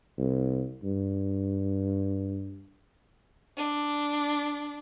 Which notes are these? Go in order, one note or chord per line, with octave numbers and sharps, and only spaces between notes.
C2
G2
D4